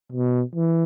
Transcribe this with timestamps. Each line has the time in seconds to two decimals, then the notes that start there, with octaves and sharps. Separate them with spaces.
0.12 B2
0.55 E3